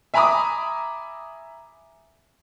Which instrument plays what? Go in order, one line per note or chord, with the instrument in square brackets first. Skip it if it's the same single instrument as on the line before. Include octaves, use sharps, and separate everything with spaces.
[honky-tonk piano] E5 G#5 A#5 B5 D6 D#6